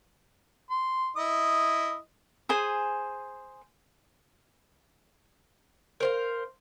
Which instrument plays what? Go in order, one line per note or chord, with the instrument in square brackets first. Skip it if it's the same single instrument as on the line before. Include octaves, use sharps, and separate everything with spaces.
[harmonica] C6
E4 D#5 D#6
[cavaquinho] G#4 C5 G#5
[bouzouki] A#4 C5 F5